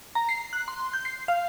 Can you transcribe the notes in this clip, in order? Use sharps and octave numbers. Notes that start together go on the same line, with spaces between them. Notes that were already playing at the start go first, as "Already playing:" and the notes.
A#5
C7
F#6
C6
G6
C7
F5